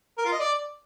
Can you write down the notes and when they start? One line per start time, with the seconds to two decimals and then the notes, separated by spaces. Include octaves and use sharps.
0.18 A#4
0.25 F4
0.32 D#5
0.39 D5